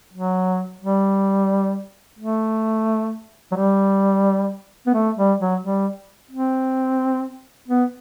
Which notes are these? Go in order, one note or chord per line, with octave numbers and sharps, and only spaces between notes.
F#3
G3
A3
F#3
G3
B3
A3
G3
F#3
G3
C4
B3